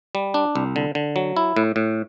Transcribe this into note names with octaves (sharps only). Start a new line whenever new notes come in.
G3
D4
C2
D3
D3
F#3
E4
A2
A2